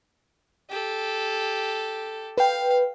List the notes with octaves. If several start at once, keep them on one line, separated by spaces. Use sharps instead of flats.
G4 A4
B4 F5 G5